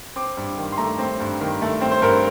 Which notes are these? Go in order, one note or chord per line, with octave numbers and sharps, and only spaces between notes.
C4 D6
G2
D#3
C6
A3 A#5
C4
G2
D#3
A3
C4
C5
G2 A#4